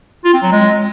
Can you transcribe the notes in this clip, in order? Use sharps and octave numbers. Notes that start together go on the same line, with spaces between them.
F4
C4
F#3
G#3